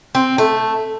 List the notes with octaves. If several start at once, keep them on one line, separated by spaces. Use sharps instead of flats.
C4
A3